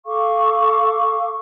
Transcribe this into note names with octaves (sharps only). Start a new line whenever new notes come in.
A4 F5 C#6 D6